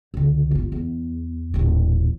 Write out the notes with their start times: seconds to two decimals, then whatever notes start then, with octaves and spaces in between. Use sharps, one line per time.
0.14 C#2 D3
0.51 G1 F4
0.72 E2
1.54 D#1 A1